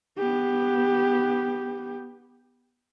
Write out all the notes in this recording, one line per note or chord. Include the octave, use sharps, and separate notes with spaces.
B3 G4